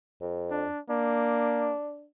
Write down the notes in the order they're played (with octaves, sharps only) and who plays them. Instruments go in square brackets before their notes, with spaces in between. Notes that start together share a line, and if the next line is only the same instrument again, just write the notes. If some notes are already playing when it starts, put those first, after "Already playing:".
[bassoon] F2
[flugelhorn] D4
[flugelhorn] A#3 [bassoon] D4